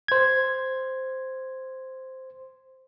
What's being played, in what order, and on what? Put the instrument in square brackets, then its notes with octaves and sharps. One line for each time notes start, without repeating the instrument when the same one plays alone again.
[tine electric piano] C5 G#6